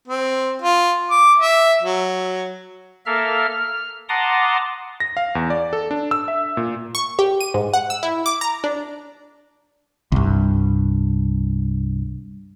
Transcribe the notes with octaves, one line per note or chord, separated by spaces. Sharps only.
C4
F4
D6
E5
F#3
A#3 A4 A#4 E5 F5 F6
F6
F#5 A5 A#5 C6 D6 D#6
A#6
F5
E2
D5
A4
D4
E6
E5
A#2
C#6
G4
D#7
G#2
F#5
E6
E4
D6
A#5
D4
C2 G2